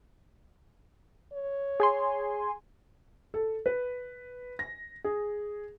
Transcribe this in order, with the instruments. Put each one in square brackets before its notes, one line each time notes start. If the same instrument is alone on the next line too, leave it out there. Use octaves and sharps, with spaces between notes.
[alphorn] C#5
[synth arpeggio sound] G#4 G#5 C6
[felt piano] A4
B4
A#6
G#4